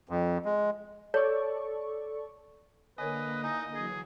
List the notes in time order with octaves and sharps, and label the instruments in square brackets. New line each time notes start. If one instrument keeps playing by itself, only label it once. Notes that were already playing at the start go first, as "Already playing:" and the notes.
[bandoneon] F2
G#3
[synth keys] A4 D5 C#6 [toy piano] C#5
[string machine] D3 A#3 [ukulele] A#4 C#5 G#5 [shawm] B4 [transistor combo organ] D#5
[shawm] D#4 [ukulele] E4 G#5
[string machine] E3 F#3 [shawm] G#4